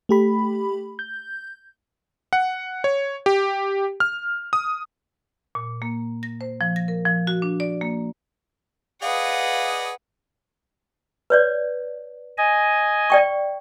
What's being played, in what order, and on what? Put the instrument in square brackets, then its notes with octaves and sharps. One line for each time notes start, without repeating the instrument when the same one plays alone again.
[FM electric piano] A3 G4 B5
G6
[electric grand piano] F#5
C#5
G4
F6
D#6
[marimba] A#2
A#3
A#6
C5
F3
A#6
A#4
F3
F#4
D4
D5
A#3
[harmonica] G#4 D5 D#5 [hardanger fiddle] B4 F#5 [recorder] F5
[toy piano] B4 C#5 D5
[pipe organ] D#5 G#5
[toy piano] D5 G5 C#6